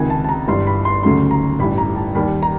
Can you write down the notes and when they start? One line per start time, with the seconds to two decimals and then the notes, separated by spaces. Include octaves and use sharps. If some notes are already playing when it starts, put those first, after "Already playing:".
Already playing: C#2 C3 D#3 G#5
0.10 A5
0.24 A5
0.29 A#5
0.48 G1 G2 E3 G3 C6
0.67 B5
0.85 C6
1.03 D2 C#3 F#3 A3 C6
1.31 A#5
1.59 A1 G2 E3 B5
1.78 A#5
1.96 A5
2.15 D#2 D#3 G3 B5
2.43 A#5